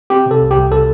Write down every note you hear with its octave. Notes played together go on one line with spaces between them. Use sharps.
C4 G4
C3 A4
C2
G4
C2
C3 A4